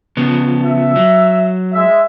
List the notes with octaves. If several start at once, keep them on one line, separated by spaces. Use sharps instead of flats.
C#3 F3 B3
E5
F#3
G#3 E5